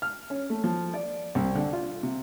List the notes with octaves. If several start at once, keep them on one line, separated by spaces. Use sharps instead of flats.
F6
C#4
A3
F3
D5
C2
D3
F4
C3